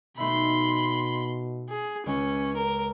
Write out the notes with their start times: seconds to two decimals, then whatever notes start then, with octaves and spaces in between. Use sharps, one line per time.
0.18 B2 A3 D#4 E5 B5 C6
1.69 G#4
2.06 C#2 G#3 C#4 D#5
2.56 A#4